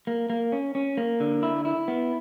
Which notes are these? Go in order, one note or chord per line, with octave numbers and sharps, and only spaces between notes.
A#3
A#3
C#4
C#4
A#3
D3
E4
E4
B3